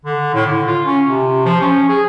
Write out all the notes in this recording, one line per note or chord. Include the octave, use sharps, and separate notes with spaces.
D3
A2
D3
F4
C#4
C3
F3
C#4
G#4